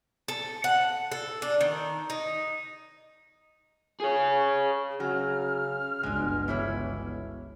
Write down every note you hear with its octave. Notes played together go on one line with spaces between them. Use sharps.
A4
F#5
A4
D4
D#3
D#4
G#4 C#5
C#3 F#3 F6
G1 C#2 B2 G#3 D4
E3 E4 C#5